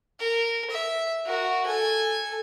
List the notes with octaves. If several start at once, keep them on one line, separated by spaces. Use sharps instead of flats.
A#4
E5
F#4 A#4
A4 G#5